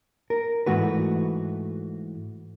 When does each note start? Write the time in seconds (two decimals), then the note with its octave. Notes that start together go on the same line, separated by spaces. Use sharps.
0.30 A#4
0.66 G#2 E3 A3 F#4 B4